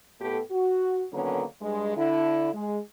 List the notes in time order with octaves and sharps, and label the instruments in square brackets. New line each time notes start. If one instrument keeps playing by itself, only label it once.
[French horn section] A2 B3 G4 A4
F#4
D3 D#3 F#3 A#3 B3 C#4
G2 G#3
D3 E4
G#3